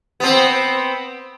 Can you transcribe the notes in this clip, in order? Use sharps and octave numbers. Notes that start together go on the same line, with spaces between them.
B3 C4